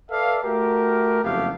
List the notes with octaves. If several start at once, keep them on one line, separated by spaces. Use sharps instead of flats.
A4 B4 D5 E5 F5
A3 F#4 G4 A#4
F#1 F2 A3 B3 G4 F5